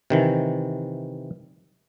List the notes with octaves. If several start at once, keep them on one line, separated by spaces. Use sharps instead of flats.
C3 D#3 E3